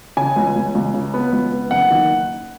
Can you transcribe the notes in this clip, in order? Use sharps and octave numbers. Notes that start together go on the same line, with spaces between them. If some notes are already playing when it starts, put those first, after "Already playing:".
C#3 G#5
C#2
C#2
C#2
C#3
B3
C#2
B3
F#1 F#5
D#3